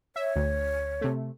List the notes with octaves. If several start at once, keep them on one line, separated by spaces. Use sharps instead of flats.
C#5 E5
D2
C3 A3